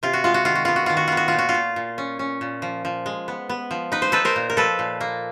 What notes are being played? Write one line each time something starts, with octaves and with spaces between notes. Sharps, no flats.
C3 F4
F#4
G#3 F4
F#4
D#3 F4
F#4
B3 F4
F#4
D#3 F4
F#4
B3 F4
F#4
A#2 F4
F#4
F4
A#2
A#2
C#4
C#4
A#2
F3
F3
G#3
B3
B3
F3
D#4 B4
C5
D#4 A4 B4
A#4 C5
A#2
A#4
F3 A4 B4
A#2
A#3